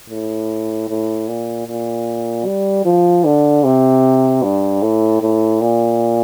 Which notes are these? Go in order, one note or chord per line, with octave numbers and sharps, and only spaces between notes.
A2
A2
A#2
A#2
G3
F3
D3
C3
G2
A2
A2
A#2